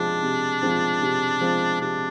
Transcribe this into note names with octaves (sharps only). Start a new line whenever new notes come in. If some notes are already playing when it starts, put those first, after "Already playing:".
Already playing: C3 F3 G#3 C4 D4
C3
F3 G#3 C4
C3
F3 G#3 C4
C3 D4